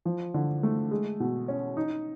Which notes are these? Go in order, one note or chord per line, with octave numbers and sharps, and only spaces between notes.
F3
D3
A3
G#3
B2
C#4
D#4